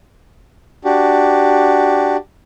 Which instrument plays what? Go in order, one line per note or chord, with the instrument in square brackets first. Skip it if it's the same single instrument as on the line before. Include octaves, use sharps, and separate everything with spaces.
[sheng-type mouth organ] D4 F#4 G4